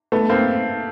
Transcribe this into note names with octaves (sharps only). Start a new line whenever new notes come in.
A3 B3
A#3 C4